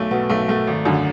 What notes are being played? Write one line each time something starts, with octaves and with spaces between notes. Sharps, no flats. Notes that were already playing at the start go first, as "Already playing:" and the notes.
Already playing: B1 A3
B2 B3
B1 A3
B2 A3
G#1
F#2 D3